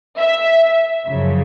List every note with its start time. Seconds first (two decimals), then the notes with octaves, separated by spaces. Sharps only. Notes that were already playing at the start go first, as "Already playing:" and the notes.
0.18 E5
1.06 F#2 C#3 F3